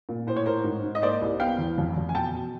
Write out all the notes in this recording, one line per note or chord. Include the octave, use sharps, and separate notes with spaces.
A#2
A2 C5
C#5
A2 A#4 C5
G#2
G#2
D#5
A#3 C5 D5
C2
B3 F5 G5
E2
F2
F2
G#5
B2 G5 A5
B2